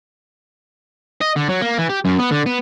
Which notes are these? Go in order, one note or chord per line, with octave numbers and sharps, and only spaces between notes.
D#5
D3
F#3
A#3
E3
G4
F#2
B3
D3
B3